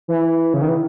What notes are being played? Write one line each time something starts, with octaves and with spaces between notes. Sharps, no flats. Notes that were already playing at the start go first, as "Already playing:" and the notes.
E3
C#3
D#3
E3